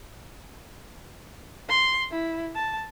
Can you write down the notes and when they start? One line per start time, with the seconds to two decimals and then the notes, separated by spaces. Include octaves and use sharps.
1.69 C6
2.11 E4
2.55 A5